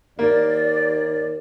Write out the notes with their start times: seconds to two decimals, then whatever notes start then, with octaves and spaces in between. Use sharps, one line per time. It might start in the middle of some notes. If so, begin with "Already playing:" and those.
0.19 D#2 A#3 D5